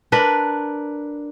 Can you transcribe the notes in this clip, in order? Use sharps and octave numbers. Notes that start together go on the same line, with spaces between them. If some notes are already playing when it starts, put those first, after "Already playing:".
D4 A#4 B4